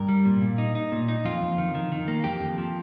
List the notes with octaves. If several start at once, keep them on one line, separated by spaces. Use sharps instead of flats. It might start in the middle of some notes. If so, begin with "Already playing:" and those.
Already playing: G2 A#4
G3
A#2
A#2
D#4
D#4
A#2
D#4
F2 F4
F2
D#3
D#3
D#3
A#3
F2 G4
F2
F3